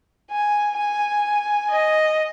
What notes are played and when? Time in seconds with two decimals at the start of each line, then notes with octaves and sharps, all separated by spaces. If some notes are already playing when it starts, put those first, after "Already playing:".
0.31 G#5
0.78 G#5
1.70 D#5